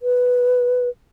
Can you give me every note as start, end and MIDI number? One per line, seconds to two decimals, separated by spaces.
0.02 0.89 71